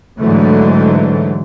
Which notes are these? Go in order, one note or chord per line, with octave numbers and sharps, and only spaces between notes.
G#2 D3 E3 F#3 A3